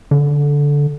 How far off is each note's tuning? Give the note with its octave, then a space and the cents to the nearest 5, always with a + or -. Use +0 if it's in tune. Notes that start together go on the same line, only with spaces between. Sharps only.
D3 -15